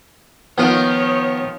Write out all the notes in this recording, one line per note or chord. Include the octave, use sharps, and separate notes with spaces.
D#3 F3 B3 F4 C#5